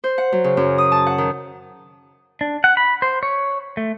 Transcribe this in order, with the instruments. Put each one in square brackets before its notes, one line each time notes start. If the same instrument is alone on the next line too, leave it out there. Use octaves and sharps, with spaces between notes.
[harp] C5
F#5
F#3
C#3
F#2
D#6
A5
F#5
D#3
[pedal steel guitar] D4
F#5
B5
C5
C#5
A3